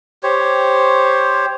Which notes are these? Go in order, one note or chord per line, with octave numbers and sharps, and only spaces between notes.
G4 C5 C#5